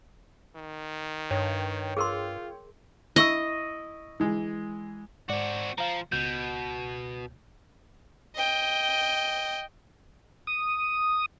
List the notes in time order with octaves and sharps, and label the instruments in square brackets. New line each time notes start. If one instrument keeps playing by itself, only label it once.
[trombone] D#3
[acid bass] G2 [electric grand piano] C#5 G5
[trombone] F4 [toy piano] G#4 A#4 C6
[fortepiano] E4 C#6 E6 [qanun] D#5
[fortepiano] E3 G#3
[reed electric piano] G#2 D5 [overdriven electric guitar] C4 F#4
[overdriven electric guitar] F3 [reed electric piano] F5 A#5
[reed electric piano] C#2 G6 [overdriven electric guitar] B2
[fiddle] D#5 G5
[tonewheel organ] D#6